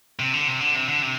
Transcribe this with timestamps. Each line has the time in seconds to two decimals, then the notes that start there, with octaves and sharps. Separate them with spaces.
0.19 C3
0.33 D3
0.48 C3
0.60 D3
0.75 C3
0.89 D3
1.02 C3